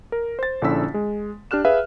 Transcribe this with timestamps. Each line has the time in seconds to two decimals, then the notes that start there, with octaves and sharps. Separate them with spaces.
0.12 A#4
0.39 C5 A6
0.62 A#1 D3 C#4 E4 E6 B6
0.94 G#3
1.51 D4 G4 F6 F#6 E7
1.65 G#4 B4 E5 F5